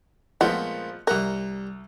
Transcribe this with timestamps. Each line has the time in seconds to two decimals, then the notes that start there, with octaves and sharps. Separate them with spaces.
0.41 A#2 F3 G#3 A3 B3 C4 F#5
1.07 C2 G3 A#4 F#5 A#5 F#6